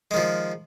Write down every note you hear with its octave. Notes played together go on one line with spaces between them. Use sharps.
D#3 F3 G#3